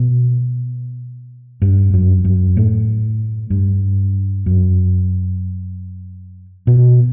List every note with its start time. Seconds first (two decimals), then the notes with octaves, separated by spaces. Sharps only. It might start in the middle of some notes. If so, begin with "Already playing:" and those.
Already playing: B2
1.62 G2
1.94 F#2
2.24 F#2
2.57 A2
3.50 G2
4.46 F#2
6.67 B2